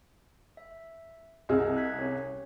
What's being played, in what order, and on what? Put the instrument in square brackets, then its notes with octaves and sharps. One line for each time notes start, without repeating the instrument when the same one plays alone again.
[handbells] E5
[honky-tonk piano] C2 G#4 [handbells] D#5 E6 F6
[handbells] F#6 G#6 B6
C#4 G4 C#5